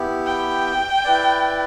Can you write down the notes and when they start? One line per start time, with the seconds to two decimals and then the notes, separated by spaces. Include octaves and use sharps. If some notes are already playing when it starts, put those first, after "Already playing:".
Already playing: B3 E4 G4
0.26 G5
1.04 E4 B4 D5